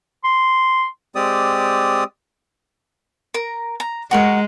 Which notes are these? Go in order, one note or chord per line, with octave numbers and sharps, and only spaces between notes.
C6
G#3 C4 G4 D5 D#6
A#4 A#5
A#5
G#3 F#4 A#4 C#6